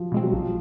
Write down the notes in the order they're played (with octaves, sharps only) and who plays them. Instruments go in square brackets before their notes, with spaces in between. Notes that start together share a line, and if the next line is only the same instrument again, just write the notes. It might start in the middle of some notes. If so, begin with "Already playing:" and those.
Already playing: [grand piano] F3 F#3
[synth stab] B2 G#3 C4
[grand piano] F#3
[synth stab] A#1 [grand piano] F3